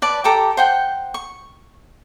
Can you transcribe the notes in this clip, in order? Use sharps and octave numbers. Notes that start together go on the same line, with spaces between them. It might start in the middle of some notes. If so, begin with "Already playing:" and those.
B4 D5 A5
G4 A4 A#5 D6
C5 F#5 G5
C#6